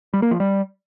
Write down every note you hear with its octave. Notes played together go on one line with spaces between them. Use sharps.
G3
A#3
F3
G3